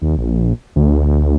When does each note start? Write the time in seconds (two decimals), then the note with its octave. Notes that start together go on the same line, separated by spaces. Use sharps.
0.02 D#2
0.17 A#1
0.76 D2